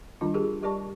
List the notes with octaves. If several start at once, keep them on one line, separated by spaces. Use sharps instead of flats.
D#3 G3 D4 F4
G4 G#4 A#4
G3 G4 A#4 D5 A5 C#6